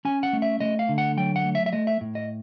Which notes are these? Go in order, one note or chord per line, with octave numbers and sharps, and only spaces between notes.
C#4 G#5
F#5
A3
E5
A3 D#5
F5
D3
F#5
F#3 G5
F#5
A3
E5
E5
A3 D#5
E5
A2
D#5